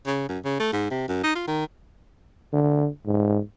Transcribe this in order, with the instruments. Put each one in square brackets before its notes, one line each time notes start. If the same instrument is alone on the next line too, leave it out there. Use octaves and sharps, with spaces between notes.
[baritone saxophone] C#3
F#2
C#3
A3
G#2
C3
F#2
D#4
F4
D#3
[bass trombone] D3
G#2